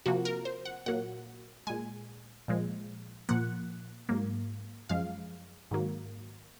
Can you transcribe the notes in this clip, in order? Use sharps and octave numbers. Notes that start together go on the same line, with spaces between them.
C3 F3 A#3 F#4
A#4
C5
F#5
A#2 F#3 A#3 F#5
A#2 G#3 G#5
A#2 F3 G#3
A#2 F3 A#3 F#5
G#2 F#3 A#3
F#2 F3 G#3 F5
G#2 D#3 F#3 A#3